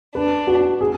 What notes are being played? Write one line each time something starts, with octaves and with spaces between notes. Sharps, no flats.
D4 B4
F#4
G#4